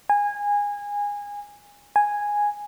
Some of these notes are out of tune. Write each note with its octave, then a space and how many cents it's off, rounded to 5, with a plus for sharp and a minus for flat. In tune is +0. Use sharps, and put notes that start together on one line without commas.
G#5 -20
G#5 -5